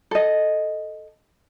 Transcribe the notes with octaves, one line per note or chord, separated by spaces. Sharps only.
A4 D#5